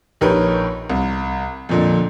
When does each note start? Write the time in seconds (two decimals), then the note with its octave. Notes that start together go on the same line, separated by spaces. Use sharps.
0.21 A#1 D#4 G4 A#4 B4 C#5
0.90 C2
1.69 F2 A#2 D3